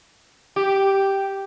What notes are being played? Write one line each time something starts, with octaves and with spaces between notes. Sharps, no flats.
G4